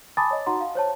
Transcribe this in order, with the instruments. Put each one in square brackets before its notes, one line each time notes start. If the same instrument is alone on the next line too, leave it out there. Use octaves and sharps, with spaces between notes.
[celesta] G#5 A5 B5 D6 D#6 A6
C#5 D#5
D#4 F#4 F#5 A#5 C6
F5
C5 C#5 A5